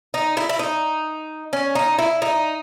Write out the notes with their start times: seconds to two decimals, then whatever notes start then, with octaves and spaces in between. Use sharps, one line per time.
0.14 D#4
0.37 E4
0.49 E4
0.59 D#4
1.53 C#4
1.75 D#4
1.99 E4
2.22 D#4